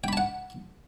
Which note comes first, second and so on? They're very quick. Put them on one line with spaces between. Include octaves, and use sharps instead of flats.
G5 B5 A5 F#5